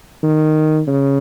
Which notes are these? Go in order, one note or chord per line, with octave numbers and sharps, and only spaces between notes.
D#3
C#3